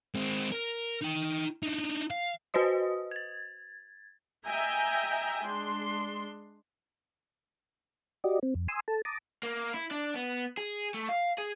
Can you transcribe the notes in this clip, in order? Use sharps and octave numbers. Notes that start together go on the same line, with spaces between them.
G#3 C4
A#4
D#4 G5
D4 D#4
F5
F#4 B4 C5 D#5 D#6
G#6 A6
D#5 E5 G5 G#5 A#5
G#3 D4 C6
F#4 G4 D5 D#5
C4
F2
G#5 C6 D#6 E6
A4 A5
A5 A#5 D6 D#6
A#3
E4
D4
B3
G#4
A3
F5
G#4